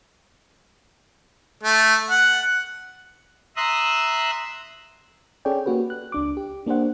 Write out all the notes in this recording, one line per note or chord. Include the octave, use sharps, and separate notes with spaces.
A3
F#5
E5 A#5 C6 D#6 E6 F#6
C#4 G#4 A4 C#5 D5 G5
A#3 C#4 F#4 G4 B4
F#6
C#2 D4 D6
G4
A#3 D4 G4 C5 F#5